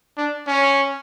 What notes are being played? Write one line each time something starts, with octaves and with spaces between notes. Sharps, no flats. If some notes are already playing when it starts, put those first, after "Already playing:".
D4
C#4